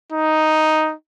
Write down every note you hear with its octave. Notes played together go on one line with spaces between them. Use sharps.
D#4